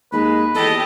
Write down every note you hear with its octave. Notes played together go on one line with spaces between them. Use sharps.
D#2 G#3 B4
E2 G4 A4 D#5